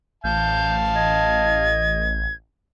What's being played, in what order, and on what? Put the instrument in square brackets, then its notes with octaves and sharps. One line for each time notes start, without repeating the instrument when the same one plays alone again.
[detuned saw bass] A1 [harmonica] F5 A5 [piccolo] G6
[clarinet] D#5 [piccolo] G#6